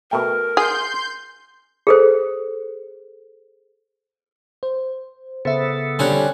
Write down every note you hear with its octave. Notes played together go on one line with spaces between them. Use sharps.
B2 A3 A#4 G5
G#4 C6 G6
G#4 A4 C5
C5
C#3 B3 A4 C5 E5
D3 G3 C4 C#4 C#5 G#5 B5 F#6